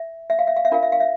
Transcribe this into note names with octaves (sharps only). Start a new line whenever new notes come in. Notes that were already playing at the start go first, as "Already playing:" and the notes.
Already playing: E5
E5
F5
E5
F5
E5
D4 F4 A#4 F5
E5
F5
E5